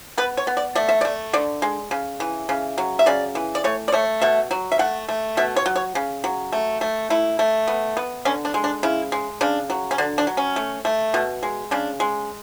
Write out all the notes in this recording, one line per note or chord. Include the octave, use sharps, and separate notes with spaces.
B3 B4
C#5
B3
D5
A3 D5
E5
A3 D5
D3 D5
G#3
C#3
E3
C#3
F#3
E5
C#3 D5
E3
D5
A3 C#5
D5
A3 C#5
B2 E5
F#3
E5
A3 F#5
A3
B2 E5
C#5
F#3
C#5
C#3
F#3
A3
A3
A3 E4
A3
B3
B3
D3 C#4
D4
G#3
D4
C#3 E4
G#3
C#3 D4
F#3
C#4
D3 D4
D4
F#3
C#4
A3
A3
B2
G#3
C#3 D4
G#3